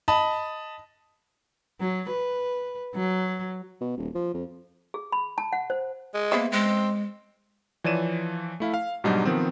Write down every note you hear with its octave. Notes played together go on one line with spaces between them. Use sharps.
D#5 A5 B5
F#3
B4
F#3
B2
D#1
F3
F2
G#4
B5
A5
F#5
C5
G#3
A#3 B3 C5 E5
G#3 C4
E3 F3 C#5 D5 D#7 E7
A3 E4 F5
F5
G#2 B2 F#3 G3 D4 D#4
D#3 F3 B3 C4